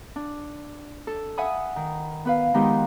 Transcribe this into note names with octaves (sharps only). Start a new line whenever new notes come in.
D4
A4
E5 F#5 G#5 B5 D#6
D#3
B3 B4 F5
D#3 F3 G#3 B3 D#4 G4